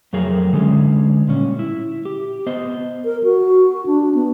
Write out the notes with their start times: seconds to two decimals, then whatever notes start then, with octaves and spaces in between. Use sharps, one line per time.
0.13 F2 F#3 A3 G#4 A#4
0.53 D3 G#3 C#4
1.28 A#2 G3 C#4
1.59 E4
2.05 G4
2.47 B3 C5 D#5
3.05 A#4
3.24 F#4
3.86 D4
4.15 B3